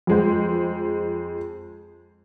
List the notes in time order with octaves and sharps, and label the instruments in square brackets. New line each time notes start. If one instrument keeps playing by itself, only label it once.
[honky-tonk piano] F2 G#3 C5